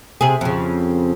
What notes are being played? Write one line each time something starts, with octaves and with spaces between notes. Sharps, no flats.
C3 G#4
F2 C#3